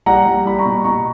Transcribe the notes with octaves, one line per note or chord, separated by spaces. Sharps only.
G3 F#5 A#5
G3
G3 B5
A#5 C#6
B2
B2 A#5 C#6